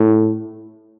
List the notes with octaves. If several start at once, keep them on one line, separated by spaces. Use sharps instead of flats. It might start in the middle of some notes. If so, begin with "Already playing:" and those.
Already playing: A2